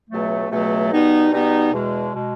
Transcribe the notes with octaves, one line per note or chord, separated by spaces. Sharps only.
C#2 B2 F#3 A3
C#2 B2 F#3 A3
B2 G3 B3 D#4
B2 G3 B3 D#4
E2 B2 G#3
B2 G#3